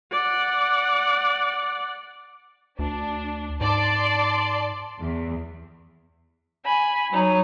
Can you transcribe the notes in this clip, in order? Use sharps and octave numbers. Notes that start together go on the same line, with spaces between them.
D5 F#5
D2 D4
G#2 D5 A5 C6
E2
G#5 B5
F#3 D#4 C#5